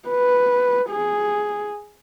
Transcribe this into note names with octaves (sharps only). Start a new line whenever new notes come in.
B4
G#4